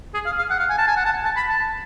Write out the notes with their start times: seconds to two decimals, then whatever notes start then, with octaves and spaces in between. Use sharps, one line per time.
0.14 G#4
0.26 F5
0.38 F5
0.51 F#5
0.60 F5
0.70 G#5
0.78 A5
0.88 G#5
0.97 F#5
1.05 A5
1.24 A5
1.37 B5
1.48 A5